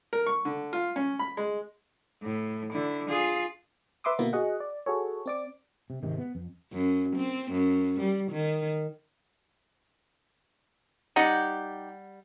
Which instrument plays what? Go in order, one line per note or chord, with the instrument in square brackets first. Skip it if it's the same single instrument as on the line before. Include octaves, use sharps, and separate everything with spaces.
[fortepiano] A#4
C#6
D3
F4
C#4
B5
G#3
[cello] A2
D3 E4
F4 G#4
[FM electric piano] B4 E5 C6 D6 D#6
B2 D3 A#3 B3 E4
F#4 G#4 D#5 F#5
D5
F#4 G#4 A4 C#5
C4 D5 D6
[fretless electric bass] C3
G#1 G#2 C3 D#3
B3
F2
[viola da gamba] F#2
C4
F#2
G3
D#3
[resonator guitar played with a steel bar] G3 F#5 [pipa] D#4 G4